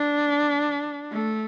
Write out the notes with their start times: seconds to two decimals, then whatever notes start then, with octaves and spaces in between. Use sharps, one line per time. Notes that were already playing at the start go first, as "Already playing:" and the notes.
Already playing: D4
1.12 A3